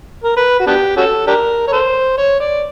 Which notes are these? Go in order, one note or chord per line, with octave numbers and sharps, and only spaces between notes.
A#4
B4
F#4
B3 D4 G4
C#4 F#4 A4
D4 G4 A#4
C#5
A4 C5
C#5
D5